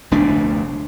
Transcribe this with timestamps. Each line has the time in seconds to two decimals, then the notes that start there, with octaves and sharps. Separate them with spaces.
0.11 F1 D2 B2 D4